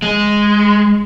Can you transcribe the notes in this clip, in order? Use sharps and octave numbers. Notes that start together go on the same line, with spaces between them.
G#3